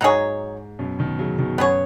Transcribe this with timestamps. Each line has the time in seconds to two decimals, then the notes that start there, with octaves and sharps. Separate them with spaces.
0.01 G#2 F#3 D#4 G#4 C#5
0.79 F#2 B2
0.99 B2 D#3
1.19 C#3 F#3
1.38 B2 D#3
1.58 F#2 B3 G#4 C#5